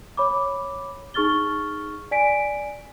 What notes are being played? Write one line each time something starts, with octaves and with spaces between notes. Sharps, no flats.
C#5 B5 D6
D#4 G#4 C#6 F6 A6 G7
D5 G#5 B6 D7